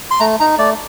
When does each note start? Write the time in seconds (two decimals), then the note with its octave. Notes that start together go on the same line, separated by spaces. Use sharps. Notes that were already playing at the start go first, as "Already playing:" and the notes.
0.11 C6
0.20 A3 A#5
0.40 D#4 A#5
0.58 A3 D5